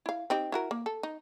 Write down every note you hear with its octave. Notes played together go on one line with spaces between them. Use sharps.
E4 F5
C4 D#4 G4
E4 F#4 A#4
A#3
A4
D#4